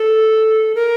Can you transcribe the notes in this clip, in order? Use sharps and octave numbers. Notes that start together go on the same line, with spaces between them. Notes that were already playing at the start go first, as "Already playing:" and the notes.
Already playing: A4
A#4